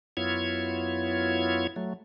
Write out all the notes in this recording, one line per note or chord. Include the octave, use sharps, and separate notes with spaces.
F#2 B3 E4 F4 C#5 G#6
F#3 A3